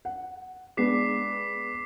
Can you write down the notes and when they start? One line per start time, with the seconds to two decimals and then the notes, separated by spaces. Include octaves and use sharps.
0.05 F#5
0.77 G#3 B3 D4 D6 B6 C7